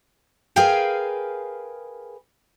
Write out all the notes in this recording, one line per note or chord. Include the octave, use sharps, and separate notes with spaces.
G#4 A#4 B4 F5 G5 G#5